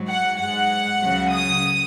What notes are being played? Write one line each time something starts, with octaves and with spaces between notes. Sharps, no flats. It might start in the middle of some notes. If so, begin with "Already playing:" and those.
Already playing: G#2 F#3
F#5
G#2 G#3 F#5
C#2 C#3 F#3
D#6